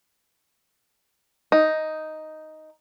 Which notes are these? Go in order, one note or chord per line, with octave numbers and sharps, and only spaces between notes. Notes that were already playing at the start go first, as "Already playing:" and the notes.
D#4